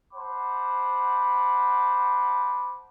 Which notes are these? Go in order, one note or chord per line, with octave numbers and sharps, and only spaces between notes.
C5 F#5 A5 B5 D6